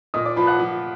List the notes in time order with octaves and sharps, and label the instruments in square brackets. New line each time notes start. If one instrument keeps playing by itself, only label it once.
[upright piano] A#2 [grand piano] D#5 D#6
[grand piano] D5 D6
[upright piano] F3 [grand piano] B4 B5
[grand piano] F#5 F#6
[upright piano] F3